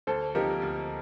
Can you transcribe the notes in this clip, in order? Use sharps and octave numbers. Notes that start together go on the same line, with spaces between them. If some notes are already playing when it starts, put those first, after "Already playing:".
D2 A4 C5
C3 F3 A#3 D#4 G4 A#4
D2